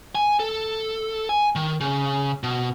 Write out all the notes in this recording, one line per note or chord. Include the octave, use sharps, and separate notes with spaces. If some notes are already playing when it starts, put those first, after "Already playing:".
G#5
A4
G#5
D#3
C#3
B2